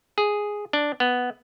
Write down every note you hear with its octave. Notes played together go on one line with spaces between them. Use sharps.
G#4
D4
B3